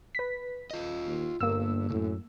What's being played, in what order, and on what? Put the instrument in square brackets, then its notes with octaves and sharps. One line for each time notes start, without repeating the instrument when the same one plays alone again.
[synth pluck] B4 B6
[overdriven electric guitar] F4 D#5
[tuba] D#2
[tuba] G1 [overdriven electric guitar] G2 [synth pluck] A#3 E6
[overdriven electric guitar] C2 F#2 [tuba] A2